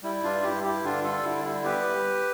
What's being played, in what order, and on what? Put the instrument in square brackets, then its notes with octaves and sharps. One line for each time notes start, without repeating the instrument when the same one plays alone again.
[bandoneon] G3 E4
G2 D4 F4
G2 E4 G4
G2 E4 G4
D3 D4 F4
G3 F4 A4
D3 E4
G3 E4
B3 G4 B4